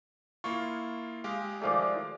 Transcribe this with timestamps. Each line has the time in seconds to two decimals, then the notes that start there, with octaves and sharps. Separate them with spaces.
0.44 A#3 E4 F4 C#6
1.24 G#3 G4 F5
1.62 D#3 F3 A3 G#4 D5 F5 D6